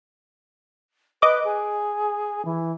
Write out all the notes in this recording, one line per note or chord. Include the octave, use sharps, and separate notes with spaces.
B4 D#5 D6
G#4
E3